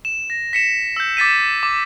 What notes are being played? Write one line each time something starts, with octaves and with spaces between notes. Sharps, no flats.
E7
A#6
B6 C#7 E7
E6 G6
D6 A6 B6 D#7
D6